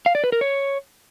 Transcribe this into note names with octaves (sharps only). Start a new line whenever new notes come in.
F5
D5
B4
A#4
C#5